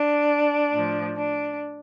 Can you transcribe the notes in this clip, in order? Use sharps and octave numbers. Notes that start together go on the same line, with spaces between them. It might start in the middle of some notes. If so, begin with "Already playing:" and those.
Already playing: D4
A2 F3
D4